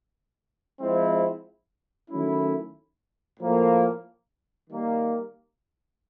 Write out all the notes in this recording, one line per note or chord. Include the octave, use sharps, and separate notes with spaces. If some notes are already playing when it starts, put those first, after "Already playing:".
F3 G#3 C4 E4
D#3 F#3 A3 C#4 E4
A2 F3 A#3
D#3 G3 A#3